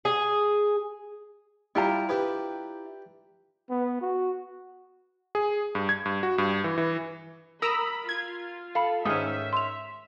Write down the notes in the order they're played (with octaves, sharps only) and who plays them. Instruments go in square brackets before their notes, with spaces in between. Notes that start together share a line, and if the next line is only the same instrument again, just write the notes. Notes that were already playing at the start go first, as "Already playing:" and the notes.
[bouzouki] G#4
[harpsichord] G3 G4 [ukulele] E4 F4 A#5
[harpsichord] D4 G4 B4
[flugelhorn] B3
F#4
[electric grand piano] G#4
G2
G#6
G2
F#4
G2
E3
E3
[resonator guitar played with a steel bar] A#4 [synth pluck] A#5 D#6 E6 [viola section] B5
[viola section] F4 [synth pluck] G#6
[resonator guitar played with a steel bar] A4 [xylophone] F5 B5
[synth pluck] G#2 [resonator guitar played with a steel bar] D#3 C#4 [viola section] E5 [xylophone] D#6 F6
[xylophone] C6 F7